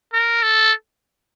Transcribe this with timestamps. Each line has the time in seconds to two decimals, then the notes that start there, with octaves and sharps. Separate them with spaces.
0.13 A#4
0.42 A4